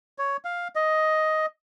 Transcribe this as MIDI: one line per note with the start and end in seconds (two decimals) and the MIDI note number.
0.18 0.37 73
0.45 0.68 77
0.75 1.46 75